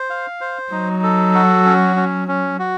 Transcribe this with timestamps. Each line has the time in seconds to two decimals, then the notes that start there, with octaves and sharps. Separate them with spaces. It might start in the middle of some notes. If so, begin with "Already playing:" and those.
Already playing: C5
0.10 F5
0.41 C5
0.72 F#3 D#4
1.03 A4
1.34 F#4
1.66 C#4
1.96 C#4
2.28 C#4
2.59 F#4